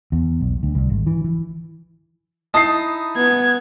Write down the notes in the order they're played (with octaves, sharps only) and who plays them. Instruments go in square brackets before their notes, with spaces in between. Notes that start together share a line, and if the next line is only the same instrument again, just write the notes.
[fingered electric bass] E2
B1
D2
C2
G#1
E3
E3
[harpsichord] D#4 E4 D#5 [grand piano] A5 D#6 C7
[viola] B3 [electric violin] G#6